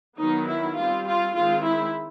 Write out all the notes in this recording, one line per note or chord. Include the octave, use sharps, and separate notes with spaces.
D#3 F#3 B3 D#4
E4
G3 C4 F4
F4
D#3 G#3 C4 F4
E4